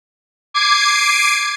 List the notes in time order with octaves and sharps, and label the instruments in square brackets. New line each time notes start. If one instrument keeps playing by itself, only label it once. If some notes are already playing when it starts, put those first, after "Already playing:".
[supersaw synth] D6 G#6 C7 D7 D#7